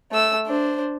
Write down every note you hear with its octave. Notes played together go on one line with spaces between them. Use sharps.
A3 E6
D4 C5